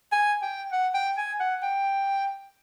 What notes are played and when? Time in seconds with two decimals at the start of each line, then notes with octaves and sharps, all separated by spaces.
0.12 G#5
0.42 G5
0.72 F#5
0.94 G5
1.18 G#5
1.40 F#5
1.62 G5